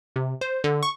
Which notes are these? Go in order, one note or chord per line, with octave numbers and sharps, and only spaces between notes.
C3
C5
D3
C#6